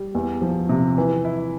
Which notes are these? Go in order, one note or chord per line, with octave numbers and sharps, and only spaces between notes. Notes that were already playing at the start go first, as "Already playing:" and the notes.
Already playing: G3
E2
F3
C3
E3
E4